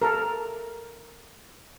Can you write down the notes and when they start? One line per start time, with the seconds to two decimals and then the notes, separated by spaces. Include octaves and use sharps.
0.02 A4 A#4